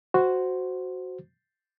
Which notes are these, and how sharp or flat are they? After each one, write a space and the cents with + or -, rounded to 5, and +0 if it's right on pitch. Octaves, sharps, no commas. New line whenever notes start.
F#4 +0 C5 -5